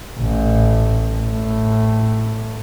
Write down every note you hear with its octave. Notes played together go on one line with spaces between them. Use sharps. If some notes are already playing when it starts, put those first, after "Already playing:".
A1
A2